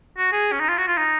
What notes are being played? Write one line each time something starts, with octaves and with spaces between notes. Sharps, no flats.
F#4
G#4
C#4
D#4
F4
F#4
F4
D#4